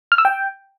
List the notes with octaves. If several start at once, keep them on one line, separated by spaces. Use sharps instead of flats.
F6
E6
G5